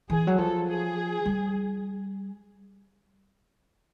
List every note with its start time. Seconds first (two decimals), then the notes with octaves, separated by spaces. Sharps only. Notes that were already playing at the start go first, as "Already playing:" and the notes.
0.10 E3 G#4
0.27 F#3
0.38 F3 A4
0.68 G#4
1.26 G3